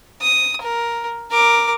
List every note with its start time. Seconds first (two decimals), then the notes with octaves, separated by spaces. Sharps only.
0.21 D#6
0.61 A#4
1.31 A#4 D6